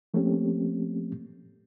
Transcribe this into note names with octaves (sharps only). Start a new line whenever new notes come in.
F3 A3 A#3 C4 C#4 G4